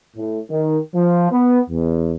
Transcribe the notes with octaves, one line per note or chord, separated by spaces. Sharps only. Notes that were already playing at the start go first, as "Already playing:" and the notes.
A2
D#3
F3
B3
E2